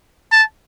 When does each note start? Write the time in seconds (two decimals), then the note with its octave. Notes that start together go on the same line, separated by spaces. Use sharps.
0.32 A5